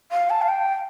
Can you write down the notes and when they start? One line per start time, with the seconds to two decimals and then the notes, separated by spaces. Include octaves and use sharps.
0.12 F5
0.30 A5
0.42 F5
0.48 G5